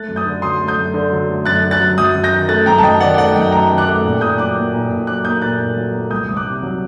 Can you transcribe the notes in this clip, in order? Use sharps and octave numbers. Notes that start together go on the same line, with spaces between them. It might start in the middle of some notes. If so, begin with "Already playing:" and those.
Already playing: A3 F#6 A6
F#2
D#6 G6
D3
F#3 C6 D#6
A3
D#6 G6
F#2
D3
F#3
A3
F#2 F#6 A6
D3
F#6 A6
F#3
F#2 D#6 G6
F#2
G6 A#6
D#3
A3 F#6 A6
F#2 G5 A#5
A5
F#2 D#5 G5
D#3 D5 F#5
G5
A3 D5 F#5
F#2 D#5 G5
F#2 G5 A#5
D#3
D6 F#6
A3
A#2
A#2 D#6 G6
F#3 D6 F#6
A#3
A#2
A#2
F#3 D6 F#6
A#3 D#6 G6
A#2 F#6 A6
A#2
F#3
A#3
C2 D#6 G6
C2 D#6
D6 F#6
C3
F#3